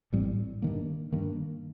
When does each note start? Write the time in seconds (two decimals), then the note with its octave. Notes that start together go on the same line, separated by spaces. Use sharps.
0.13 A1 A2 G3 C4
0.62 G2 D#3 A#3
1.12 G2 D#3 A#3